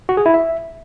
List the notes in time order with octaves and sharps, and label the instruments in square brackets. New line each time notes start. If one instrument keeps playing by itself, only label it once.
[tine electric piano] F#4
G#4
E4
E5